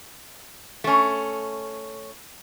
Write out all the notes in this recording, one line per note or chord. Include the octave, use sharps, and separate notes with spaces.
A3 C#4